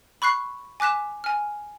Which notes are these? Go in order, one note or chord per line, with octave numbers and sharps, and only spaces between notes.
B5 C#6 F#6 C7
G#5 D6 F#6 B6 E7
G#5 F6